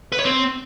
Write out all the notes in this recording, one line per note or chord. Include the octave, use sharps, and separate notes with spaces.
B4
C#5
C4